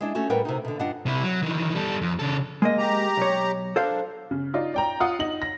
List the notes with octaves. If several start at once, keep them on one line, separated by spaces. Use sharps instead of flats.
G#3 D4 E4
A3 C#4 F#4 A4
A2 G3 A#4 B4 F#5 G5
C3 D#4
B2 D3
G2 D4 F4 D#5 F#5
C3 E4
F#3
D#3 E3
G3 A4
F2
C#3 A4
G#3 A#3 D#5
G4 A#5
B1 C#5
D4 A4 C5 F5
C#3
D#4 F4 D5
D5 G5 A#5
F4 F#5 D#6
D#4 F#7
A#6